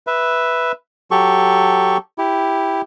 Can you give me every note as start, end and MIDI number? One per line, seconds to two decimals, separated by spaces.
0.07 0.72 71
0.07 0.72 76
1.11 1.97 54
1.11 1.97 67
1.11 1.97 69
1.11 1.97 85
2.18 2.82 64
2.18 2.82 67